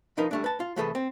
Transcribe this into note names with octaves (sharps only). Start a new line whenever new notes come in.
B1 F3 D#4 A#4 B4 F5
G3 A3 D4
B4 A5
F4
C2 E3 A3 G#4 A4 B4
C4